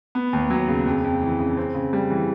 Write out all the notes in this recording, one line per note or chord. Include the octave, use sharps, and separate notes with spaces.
B3
D#2
F#3
C#3
F2
F2
E3
C#3
C4
C#3
G3
E3